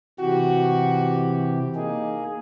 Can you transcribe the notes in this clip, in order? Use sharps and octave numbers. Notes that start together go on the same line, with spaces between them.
C3 E3 F#4 G4
A#3 D#4 G#4